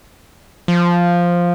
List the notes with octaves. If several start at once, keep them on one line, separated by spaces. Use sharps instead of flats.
F3